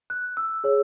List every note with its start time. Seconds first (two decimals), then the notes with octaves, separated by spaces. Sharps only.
0.10 F#6
0.37 E6
0.64 G#4 C#5